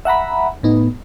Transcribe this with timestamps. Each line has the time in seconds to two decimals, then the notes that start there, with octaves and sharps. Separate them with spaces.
0.05 E5 F#5 A#5 B5
0.63 A2 B3 D#4